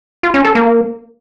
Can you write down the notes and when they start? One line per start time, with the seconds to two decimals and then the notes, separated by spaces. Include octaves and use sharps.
0.23 F4
0.34 C#4
0.45 A4
0.55 A#3